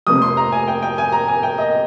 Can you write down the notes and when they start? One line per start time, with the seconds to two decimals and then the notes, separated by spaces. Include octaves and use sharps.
0.07 F1 F2 C3 D#6
0.22 C6
0.37 A#5
0.52 G#5
0.68 G5
0.82 G5
0.98 G#5
1.12 A#5
1.28 G#5
1.43 G5
1.58 D#5